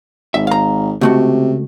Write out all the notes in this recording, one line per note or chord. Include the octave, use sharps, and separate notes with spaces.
G#1 E5
F5 A#5
C#2 C3 A3 F#4